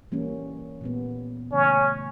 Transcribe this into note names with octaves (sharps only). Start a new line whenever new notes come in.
E3 G3 A#3 C#4
A#2 G3 B3
C#3 E3 A3 C#4